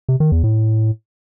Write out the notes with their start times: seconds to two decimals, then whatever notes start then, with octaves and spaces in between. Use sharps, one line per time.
0.09 C3
0.20 D#3
0.32 E2
0.43 A2